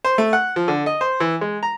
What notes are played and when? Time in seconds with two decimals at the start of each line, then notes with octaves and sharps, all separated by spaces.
0.04 C5
0.18 A3
0.33 F#5
0.56 F3
0.68 D3
0.86 D#5
1.01 C5
1.20 E3
1.41 G#3
1.63 A#5